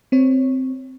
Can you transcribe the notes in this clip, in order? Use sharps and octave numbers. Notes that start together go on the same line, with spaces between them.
C4 C#5